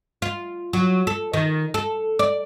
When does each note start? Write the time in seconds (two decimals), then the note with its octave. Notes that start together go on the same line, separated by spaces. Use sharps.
0.22 F4
0.73 F#3
1.07 A4
1.33 D#3
1.74 A4
2.19 D5